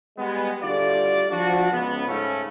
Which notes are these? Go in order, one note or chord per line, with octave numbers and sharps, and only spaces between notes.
G3 G#3 B3
D3 G3 A3 F4 F#4 D5
F3 D4 F#4
C#2 B3
G#2 C#3 A3 C#4